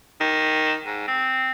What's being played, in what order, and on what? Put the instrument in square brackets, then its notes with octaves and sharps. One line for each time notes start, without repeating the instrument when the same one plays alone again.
[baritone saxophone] D#3
G#2
C4